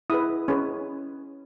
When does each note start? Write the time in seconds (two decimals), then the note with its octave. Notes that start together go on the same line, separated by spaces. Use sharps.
0.10 E4 G#4 B4 D#6
0.48 C#4 G#4 B4